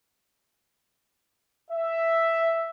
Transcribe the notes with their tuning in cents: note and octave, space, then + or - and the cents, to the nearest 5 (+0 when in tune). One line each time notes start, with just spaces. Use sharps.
E5 +5